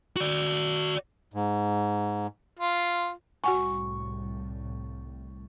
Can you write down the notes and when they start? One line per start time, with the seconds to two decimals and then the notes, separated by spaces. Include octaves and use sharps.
0.16 F#4 D5
1.34 G#2
2.59 F4
3.44 C2 A2 G3 F#4 F#5 G#5 C#6